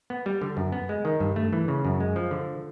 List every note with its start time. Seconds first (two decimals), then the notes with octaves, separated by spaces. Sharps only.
0.10 B3
0.26 G3
0.42 D3
0.57 F#2
0.72 B3
0.89 G#3
1.05 D#3
1.20 G2
1.36 A3
1.53 E3
1.68 C#3
1.85 F#2
2.00 G#3
2.16 F3
2.31 D3